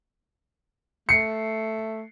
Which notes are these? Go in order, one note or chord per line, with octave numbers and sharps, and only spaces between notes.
A3 C7 C#7